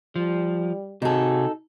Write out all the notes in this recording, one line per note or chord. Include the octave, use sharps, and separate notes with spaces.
F3 G3
C3 D#4 F#4 G#4 A4